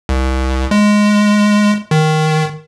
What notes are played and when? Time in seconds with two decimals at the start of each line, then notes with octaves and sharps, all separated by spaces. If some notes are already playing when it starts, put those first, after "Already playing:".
0.09 C2
0.71 G#3
1.91 D#3